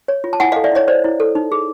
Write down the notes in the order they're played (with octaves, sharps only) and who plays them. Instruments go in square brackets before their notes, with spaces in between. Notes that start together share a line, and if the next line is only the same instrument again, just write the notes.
[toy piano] C#5
F4
A5
E4 F#5 G#5
A4 D#5 F5
D5 E5
E4 C#5 D#5
C5 D5
E4
A4
D#4
G#4